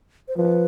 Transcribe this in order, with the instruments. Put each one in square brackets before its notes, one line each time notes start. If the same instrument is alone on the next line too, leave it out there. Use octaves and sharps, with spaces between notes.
[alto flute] C5
[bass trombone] F3 [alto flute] B4